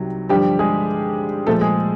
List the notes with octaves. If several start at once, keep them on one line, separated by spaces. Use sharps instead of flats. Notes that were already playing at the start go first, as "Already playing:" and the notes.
Already playing: C2 C3 D#3 F#3
G2 D3 F3 G3 G4
G#3 G#4
A#2 F3 G#3 A3 A4
G#3 G#4